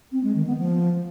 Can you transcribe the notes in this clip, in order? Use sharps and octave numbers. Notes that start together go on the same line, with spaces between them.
C4
G#3
D#3
B3
F3